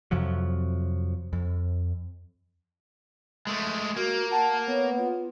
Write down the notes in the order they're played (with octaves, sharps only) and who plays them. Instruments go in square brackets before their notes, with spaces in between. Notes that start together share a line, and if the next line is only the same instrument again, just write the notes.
[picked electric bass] F2 C3 F3 F#3
F2
[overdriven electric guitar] G#3 A3
[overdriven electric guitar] A#3 [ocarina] F#4
[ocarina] F#5 [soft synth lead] A5
[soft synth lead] B3 [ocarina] C#5
[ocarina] F4